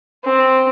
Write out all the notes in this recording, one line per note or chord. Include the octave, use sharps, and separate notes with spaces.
C4